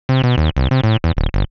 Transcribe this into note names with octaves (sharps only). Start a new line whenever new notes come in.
C3
B2
D#2
C2
C3
A2
E2
D1
G1